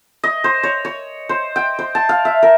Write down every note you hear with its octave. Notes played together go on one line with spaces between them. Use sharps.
D#5
C5
C#5
C#5
C5
G5
C5
A5
F5
E5
A#4